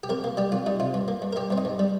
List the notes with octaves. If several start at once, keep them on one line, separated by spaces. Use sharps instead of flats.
G4
F2 A#4
A#3
G3 G4
F2 F4
G3 D#4
C3 F4
G2
A#3
G2
A#4
G2 G4
G2 C4
D#4
G2
G3